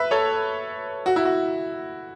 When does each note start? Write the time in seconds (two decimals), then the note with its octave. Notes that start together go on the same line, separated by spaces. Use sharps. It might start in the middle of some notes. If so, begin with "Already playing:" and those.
Already playing: B4 E5
0.11 A4 C#5
1.06 F#4
1.16 E4
1.25 F#4